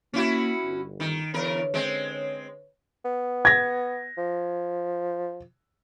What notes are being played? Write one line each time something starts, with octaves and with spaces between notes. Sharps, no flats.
A#3 C#4 E4 F#4
G1
D#3
E2 D3 A#4 B4 C#5
G#3 C4
B3
G#6 A#6
F3